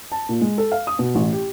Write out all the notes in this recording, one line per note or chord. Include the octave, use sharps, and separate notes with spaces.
A5
A#2
G#3
A4
F5
D#6
B2
A1
G4